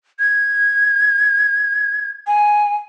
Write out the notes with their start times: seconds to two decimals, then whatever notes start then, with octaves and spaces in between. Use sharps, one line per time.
0.19 G#6
2.27 G#5